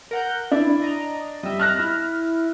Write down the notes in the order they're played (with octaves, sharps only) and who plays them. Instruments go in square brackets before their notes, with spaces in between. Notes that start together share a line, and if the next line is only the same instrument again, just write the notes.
[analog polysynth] A#4 F#5 G6
[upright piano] D4 [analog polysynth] E4
[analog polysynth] D#5 A#5
[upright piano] G3 [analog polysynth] D#5 E5
[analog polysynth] A5 [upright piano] F6 F#6 A#6
[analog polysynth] E4